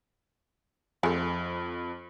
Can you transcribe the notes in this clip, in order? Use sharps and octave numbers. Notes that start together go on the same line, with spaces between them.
F2 G#3 A3